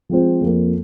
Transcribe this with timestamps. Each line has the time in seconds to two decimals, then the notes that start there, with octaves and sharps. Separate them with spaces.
0.09 F3 G#3 C4 F4 C5
0.41 F2 F3 A#3